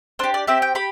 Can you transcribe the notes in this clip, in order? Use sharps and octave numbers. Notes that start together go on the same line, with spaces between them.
D4 G4 C5
D5
C4 G4 E5
G5
G4 B5